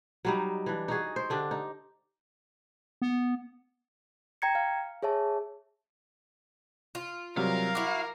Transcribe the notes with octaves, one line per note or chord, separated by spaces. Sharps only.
F#3 G3 D#4
E3 D4
D#4 F#4 G#4
C5
D3 D4 G4
D#4
B3
G5 A#5 G#6 C#7
F5
G#4 C#5 E5 A5
F4
C3 F#3 G3 A#4 F5
E4 F#4 D6